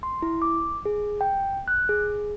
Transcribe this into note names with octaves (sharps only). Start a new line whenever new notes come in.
C6
E4
D6
G#4
G5
F#6
G#4